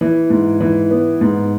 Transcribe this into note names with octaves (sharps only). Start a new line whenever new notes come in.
E3
G#2
E3
B3
G#2